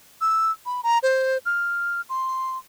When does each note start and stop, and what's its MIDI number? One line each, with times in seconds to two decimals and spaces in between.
0.21 0.52 88
0.66 0.81 83
0.83 0.98 82
1.03 1.38 72
1.46 2.01 89
2.09 2.58 84